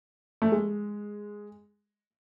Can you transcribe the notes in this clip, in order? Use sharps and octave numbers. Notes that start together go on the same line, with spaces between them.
A3
G#3